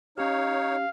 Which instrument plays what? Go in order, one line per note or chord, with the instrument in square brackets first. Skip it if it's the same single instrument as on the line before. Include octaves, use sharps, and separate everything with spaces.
[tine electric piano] C#4 G4 [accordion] D#4 C#5 [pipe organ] F5